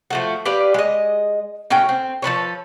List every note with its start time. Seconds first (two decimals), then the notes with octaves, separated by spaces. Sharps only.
0.10 F3 A3 F#4
0.45 G4 B4 D5 F5
0.74 G#3 D#5
1.70 A2 C#4 F#4 G5
1.89 C4
2.22 F3 A4 B4 C#5